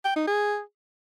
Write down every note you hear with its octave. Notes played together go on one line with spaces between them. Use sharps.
G5
D#4
G#4